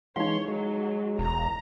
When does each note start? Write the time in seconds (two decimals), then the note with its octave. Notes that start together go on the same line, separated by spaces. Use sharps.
0.16 E3 G#3 D#4 C#5 F5 C6
0.48 F#3 G#3
1.19 E1 A#5